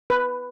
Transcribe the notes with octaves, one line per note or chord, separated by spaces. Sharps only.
B4